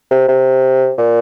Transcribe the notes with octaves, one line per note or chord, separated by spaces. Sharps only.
C3
C3
A#2